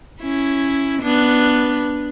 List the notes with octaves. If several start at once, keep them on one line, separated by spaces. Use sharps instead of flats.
C#4 E4
B3 D4